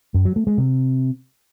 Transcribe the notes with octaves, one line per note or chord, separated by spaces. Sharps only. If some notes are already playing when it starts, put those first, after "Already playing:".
F#2
F#3
A3
G#3
C3